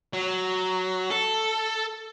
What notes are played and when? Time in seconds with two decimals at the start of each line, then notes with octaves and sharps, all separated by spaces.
0.13 F#3
1.10 A4